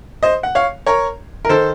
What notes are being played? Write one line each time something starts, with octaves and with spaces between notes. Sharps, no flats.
C5 D#5
F#5
C#5 F5
A#4 C#5
A#4
D#3 A4 C5